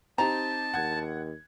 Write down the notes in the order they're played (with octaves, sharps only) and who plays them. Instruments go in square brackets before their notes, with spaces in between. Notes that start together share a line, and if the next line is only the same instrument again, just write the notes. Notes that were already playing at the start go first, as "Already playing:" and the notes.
[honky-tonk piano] C4 D#4 G4 [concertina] A5 [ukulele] A#5
[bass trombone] D#2 [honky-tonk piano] F#5 G#6